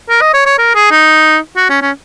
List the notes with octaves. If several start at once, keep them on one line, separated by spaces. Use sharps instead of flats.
A#4
D#5
C#5
C#5
A#4
G#4
D#4
F#4
C#4
C#4